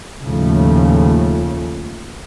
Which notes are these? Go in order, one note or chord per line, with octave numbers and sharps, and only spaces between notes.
D#2 A2 C#3 F3 A3